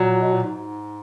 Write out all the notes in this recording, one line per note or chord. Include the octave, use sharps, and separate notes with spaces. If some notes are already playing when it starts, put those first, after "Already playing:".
Already playing: A#2 F#3
B2
A#2
G#2